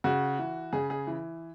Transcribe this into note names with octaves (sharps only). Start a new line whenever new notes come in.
C#3 F#4
E3
C#3 G#4
G#4
E3